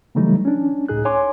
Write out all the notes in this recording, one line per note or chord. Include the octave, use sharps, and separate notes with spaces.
C#3 E3 F#3 G3 A3 D#4
C#4 D4
C#2 A2 D#4 G#4 F#6
C#5 G#5 C6 D6